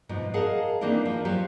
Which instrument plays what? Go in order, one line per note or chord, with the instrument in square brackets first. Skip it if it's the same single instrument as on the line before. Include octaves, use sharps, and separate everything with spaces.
[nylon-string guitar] G#2 B2 F3
G#4 A#4 D#5 F5 F#5 A5
D#3 E3 A#3 C4 D4 E4
F3
F#3 F4 G4 C5